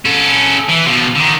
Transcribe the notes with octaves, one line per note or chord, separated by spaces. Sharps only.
C#4 A4
E3
B2 F3
D3 D#3